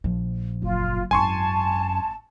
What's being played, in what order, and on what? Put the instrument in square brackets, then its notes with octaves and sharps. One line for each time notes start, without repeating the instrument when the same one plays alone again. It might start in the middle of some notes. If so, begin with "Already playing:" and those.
[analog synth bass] A#1 [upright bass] F3
[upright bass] F#1 F#3 [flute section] F4
[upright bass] G#1 E4 [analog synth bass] F#2 [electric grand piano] G#5 C6 C#6 [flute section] A5